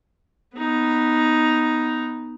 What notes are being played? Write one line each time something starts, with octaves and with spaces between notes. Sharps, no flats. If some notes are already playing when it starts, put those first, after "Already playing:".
B3 D#4